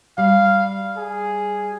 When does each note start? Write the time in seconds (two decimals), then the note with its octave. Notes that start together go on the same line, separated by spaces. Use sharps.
0.18 G3 F5
0.97 G#4